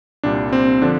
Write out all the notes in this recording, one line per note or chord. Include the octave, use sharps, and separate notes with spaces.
C2 A#2 G3 D4
C4
D3 F3 D4